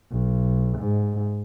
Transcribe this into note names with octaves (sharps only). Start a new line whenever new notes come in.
B1
G#2